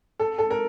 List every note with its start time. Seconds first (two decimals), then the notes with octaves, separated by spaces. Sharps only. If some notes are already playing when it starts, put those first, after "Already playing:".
0.20 A4
0.38 A4
0.50 A#4